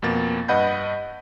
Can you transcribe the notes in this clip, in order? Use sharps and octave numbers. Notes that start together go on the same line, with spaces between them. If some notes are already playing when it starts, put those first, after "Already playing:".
F2 B2 A#3 A6
G2 B4 D#5 F#5 B5 G6